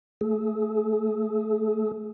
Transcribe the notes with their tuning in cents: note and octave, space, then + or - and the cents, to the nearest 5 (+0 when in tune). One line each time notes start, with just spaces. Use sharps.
A3 +0 G#4 +45